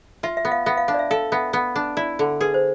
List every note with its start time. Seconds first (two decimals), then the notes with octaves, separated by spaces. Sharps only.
0.23 F4 E5
0.37 E5
0.45 B3
0.52 F5
0.66 B3 E5
0.77 F5
0.88 D4 F5
0.94 D5
0.99 E5
1.11 A4 F5
1.32 B3 E5
1.53 B3
1.76 D4
1.97 E4 D5
2.19 D3
2.41 G#4 B4
2.54 C5